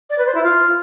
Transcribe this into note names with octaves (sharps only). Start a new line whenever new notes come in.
D5
B4
C5
E4
F4